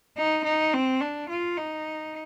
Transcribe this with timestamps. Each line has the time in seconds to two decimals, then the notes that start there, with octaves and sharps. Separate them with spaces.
0.17 D#4
0.45 D#4
0.74 C4
1.01 D4
1.29 F4
1.57 D#4